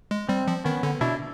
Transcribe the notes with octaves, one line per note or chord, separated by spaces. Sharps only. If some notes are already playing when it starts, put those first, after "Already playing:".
G#3
G3 C4
F3
D#3 B3 C#4
D3
B2 D4 E4